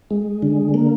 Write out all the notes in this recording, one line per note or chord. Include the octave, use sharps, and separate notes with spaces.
G#3
D3
A#3